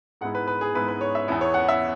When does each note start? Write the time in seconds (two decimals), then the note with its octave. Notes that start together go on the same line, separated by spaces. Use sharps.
0.21 G#2 G#3 B3 E4 F#5
0.35 B4
0.47 B4
0.61 G#4
0.74 G#2 G#3 B3 E4 B4
0.88 B4
1.01 C#5
1.15 E5
1.28 E2 E3 B3 E4
1.41 C#5
1.54 F#5
1.68 E5